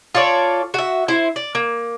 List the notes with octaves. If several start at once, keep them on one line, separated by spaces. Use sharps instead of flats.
F4 A4 C#5 D5
F#4 E5
E4 C5
D5
A#3